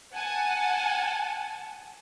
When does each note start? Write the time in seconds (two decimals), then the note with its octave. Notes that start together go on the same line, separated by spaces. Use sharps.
0.14 F#5 G#5 A5